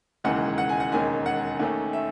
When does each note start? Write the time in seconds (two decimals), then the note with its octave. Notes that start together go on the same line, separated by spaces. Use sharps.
0.24 E1 D#2 C#3 E3 G#3 F#5
0.58 F#5
0.69 G#5
0.80 F#5
0.92 E1 D#2 D#3 G#3 C#4 G#5
1.26 F#5
1.59 D#2 D#3 A3 C#4
1.93 E5